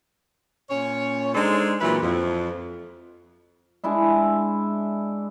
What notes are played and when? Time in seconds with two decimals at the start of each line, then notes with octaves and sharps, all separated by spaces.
0.70 A#2 C#4 C#5
1.34 G#3 D4 D#4 A4 C5
1.81 A#2 E3 F#3 E4 B4
2.03 F2
3.84 G#3 D4 E4 E5